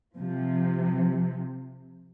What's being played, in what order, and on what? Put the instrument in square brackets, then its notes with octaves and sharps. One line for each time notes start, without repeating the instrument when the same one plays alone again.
[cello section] C3 F3